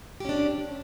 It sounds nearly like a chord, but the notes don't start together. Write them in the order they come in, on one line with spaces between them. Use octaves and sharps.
G4 C#4 D4